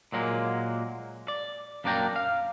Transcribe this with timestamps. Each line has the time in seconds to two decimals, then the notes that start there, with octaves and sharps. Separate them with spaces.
0.12 A#2 F#3 G#3 A#3
1.28 D5
1.84 F#2 A#3 D4 D5 G5 A#5
2.16 F5